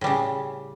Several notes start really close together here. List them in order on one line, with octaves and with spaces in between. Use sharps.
A2 G3 C#3